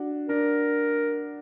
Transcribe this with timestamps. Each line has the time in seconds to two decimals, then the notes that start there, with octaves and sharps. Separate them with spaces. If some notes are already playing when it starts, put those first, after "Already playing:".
Already playing: D4 F#4
0.29 D4 A#4